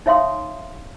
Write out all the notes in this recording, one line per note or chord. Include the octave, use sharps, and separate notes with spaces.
D#4 C#5 E5 F5 C6 D#6